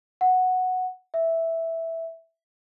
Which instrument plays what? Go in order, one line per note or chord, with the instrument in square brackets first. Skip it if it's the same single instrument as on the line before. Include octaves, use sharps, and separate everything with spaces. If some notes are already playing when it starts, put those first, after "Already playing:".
[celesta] F#5
E5